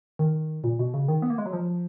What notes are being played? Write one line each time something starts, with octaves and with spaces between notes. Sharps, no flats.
D#3
A#2
B2
C#3
D#3
B3
A#3
G#3
F#3
F3